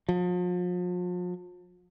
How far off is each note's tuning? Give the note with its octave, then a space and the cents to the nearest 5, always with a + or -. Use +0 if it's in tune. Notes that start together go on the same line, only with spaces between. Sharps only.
F3 +40